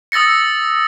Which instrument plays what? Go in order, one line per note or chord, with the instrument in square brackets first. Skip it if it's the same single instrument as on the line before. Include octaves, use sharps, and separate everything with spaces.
[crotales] D#6 E6 A6 A#6 C#7